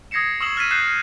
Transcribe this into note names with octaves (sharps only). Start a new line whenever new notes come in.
D#6 G#6 A#6 C7 C#7 E7
C#6 D#6 E6 C7 E7 F#7
F6 G#6 A6 B6 D#7
F#6 G6 C7 D#7 E7